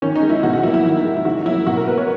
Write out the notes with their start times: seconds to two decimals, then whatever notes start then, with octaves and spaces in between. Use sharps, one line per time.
0.02 D#3 C#4
0.16 D#4
0.22 G#3
0.30 E4
0.43 B2 F#4
0.53 F#4
0.63 F#3 E4
0.67 A#3
0.74 E4
0.85 D#3
1.05 G#3
1.17 E4
1.25 C#3 F#4
1.46 F#3 A#3 E4
1.67 B2 F#4
1.77 A#4
1.87 A#3 B4
1.98 C#5